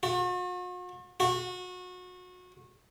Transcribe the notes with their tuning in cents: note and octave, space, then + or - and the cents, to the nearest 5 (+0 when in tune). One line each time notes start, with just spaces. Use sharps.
F#4 -45
F#4 -30